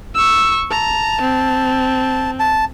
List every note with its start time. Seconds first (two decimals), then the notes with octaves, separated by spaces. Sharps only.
0.15 C#6 E6
0.71 A5 A#5
1.21 C4
2.39 A5